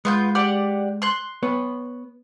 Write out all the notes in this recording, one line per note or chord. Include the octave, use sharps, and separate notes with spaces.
G#3 B3 F4 G6
G4 D5 F#5
C6 F#6
B3 B4 C#5